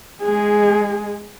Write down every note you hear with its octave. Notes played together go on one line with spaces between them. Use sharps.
G#3 G#4